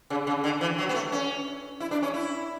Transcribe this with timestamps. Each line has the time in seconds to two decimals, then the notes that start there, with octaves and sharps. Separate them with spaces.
0.10 C#3
0.27 C#3
0.44 D3
0.61 E3
0.78 F#3
0.89 B3
0.95 A3
1.12 C#4
1.80 E4
1.91 D4
2.03 C#4
2.14 E4